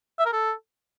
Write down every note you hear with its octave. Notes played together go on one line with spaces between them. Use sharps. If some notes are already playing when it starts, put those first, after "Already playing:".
E5
A#4
A4